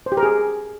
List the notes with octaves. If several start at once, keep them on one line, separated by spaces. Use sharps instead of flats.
C5
G4
A#4
G#4